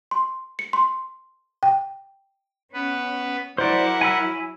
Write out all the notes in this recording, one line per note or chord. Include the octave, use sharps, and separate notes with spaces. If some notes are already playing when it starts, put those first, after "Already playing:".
C6
C#7
C6
G5
B3 C#4 B4
F#3 E4 A#4 C5 D5 F#5
G#5 B5 E6